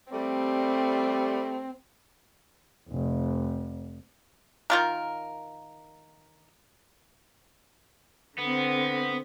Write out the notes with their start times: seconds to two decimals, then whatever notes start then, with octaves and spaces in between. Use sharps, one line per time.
0.13 G3 A3 C4
2.90 F1
4.70 D#3 F4 A#4
8.38 D3 B3 C4